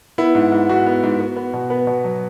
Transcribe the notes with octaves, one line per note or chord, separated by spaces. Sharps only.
B3 E4
G#2
G#2
G#2 F#4
B3
G#2
B3
B3
B2
B3 B4
B2
F#3